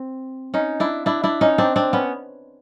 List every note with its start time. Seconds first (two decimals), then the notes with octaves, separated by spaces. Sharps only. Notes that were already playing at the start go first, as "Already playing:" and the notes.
Already playing: C4
0.54 C#4 D#4
0.80 D4 E4
1.06 D4 E4
1.24 D4 E4
1.41 C#4 D#4
1.58 C4 D4
1.76 C4 D4
1.93 B3 C#4